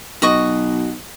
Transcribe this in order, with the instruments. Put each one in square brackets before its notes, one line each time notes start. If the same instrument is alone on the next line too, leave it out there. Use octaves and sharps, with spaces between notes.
[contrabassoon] B1 [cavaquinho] F#4 D#5 C#6